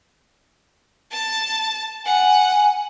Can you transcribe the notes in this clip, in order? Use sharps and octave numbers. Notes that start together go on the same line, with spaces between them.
A5
F#5 G#5